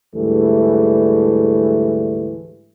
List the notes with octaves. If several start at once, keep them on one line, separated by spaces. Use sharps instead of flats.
D2 G#2 E3 G3 A3